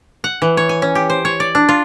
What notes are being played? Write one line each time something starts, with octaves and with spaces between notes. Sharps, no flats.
F#5
E3
C#5
G#5
C#4
G4
C5
C#5
D5
D4
F4